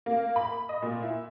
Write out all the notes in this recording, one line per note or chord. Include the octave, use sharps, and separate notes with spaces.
A#3
B5
D#5
A#2
E4